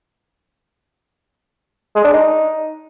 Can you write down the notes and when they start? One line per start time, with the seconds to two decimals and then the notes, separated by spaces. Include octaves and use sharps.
1.95 G#3
2.04 D4
2.13 D#4